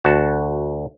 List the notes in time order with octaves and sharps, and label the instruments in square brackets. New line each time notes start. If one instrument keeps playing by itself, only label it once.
[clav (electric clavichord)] D2 F#4 A5